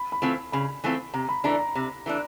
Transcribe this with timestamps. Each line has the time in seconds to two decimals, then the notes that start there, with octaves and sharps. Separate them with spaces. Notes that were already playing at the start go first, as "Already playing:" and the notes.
Already playing: B5
0.12 B5
0.22 E3 A3 C4 F4
0.52 C#3 B5
0.84 E3 A3 C4 F4
1.14 C3 A#5
1.29 B5
1.44 E3 A3 D4 A#5
1.59 A#5
1.75 C3
2.06 E3 A3 D4